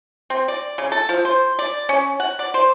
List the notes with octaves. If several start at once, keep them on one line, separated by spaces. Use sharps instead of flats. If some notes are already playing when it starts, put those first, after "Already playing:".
C4
D5
C#3
A4
F3
C5
D5
C#4
F#5
D5
C5